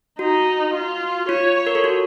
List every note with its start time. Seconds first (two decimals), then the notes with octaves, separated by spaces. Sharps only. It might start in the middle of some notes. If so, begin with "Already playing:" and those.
0.19 D#4 F#4
0.74 F4
1.29 F4 C#5
1.67 A#4
1.75 A4
1.84 F#4